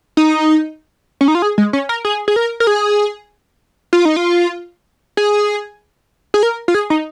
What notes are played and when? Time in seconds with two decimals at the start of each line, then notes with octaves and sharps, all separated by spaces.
0.17 D#4
1.21 C#4
1.28 D#4
1.35 F4
1.42 G#4
1.58 G#3
1.73 C#4
1.89 A#4
2.05 G#4
2.28 G#4
2.36 A#4
2.60 A#4
2.67 G#4
3.93 F4
4.05 D#4
4.16 F4
5.17 G#4
6.34 G#4
6.43 A#4
6.68 F4
6.74 G#4
6.90 D#4